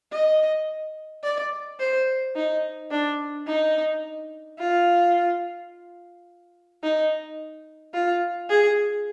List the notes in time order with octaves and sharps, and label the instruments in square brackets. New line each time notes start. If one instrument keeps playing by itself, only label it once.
[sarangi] D#5
D5
C5
D#4
D4
D#4
F4
D#4
F4
G#4